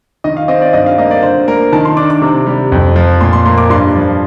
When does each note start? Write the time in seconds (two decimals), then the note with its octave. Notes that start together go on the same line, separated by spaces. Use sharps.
0.24 D#3 D#5
0.37 F5
0.48 C4 D#5
0.61 D5
0.73 G2 D#5
0.86 F5
0.98 A#3 D#5
1.11 D5
1.22 D3 C5
1.47 A#3 A#4
1.73 D#3 A5
1.85 C6
1.97 D4 D6
2.10 D6
2.22 C3
2.46 G3
2.72 F2
2.96 F3
3.21 A#2 C6
3.33 C6
3.45 A#3 C6
3.58 D6
3.70 G2 C6
3.95 F3